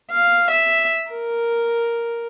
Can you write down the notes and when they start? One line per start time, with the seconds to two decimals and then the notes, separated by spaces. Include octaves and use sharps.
0.11 F5
0.51 E5
1.11 A#4